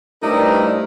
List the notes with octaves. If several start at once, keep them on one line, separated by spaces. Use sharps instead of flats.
G2 A3 D#4 E4 A#4 C5 D5 D#6